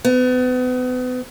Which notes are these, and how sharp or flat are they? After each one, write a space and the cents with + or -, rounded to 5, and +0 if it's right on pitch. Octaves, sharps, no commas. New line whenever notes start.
B3 +35